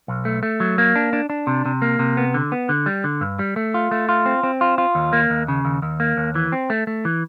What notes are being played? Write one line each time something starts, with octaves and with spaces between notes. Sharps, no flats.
B1
A3
A3
F#3
A#3
D4
D4
D4
C3
C3
A#3
C3
B3
D3
B3
D3
G3
D3
G2
G3
A3
F4
A3
F4
C4
C4
F4
F4
D#2
A#3
D#2
C#3
D#2
D#2
A#3
D#2
E3
C4
A3
A3
E3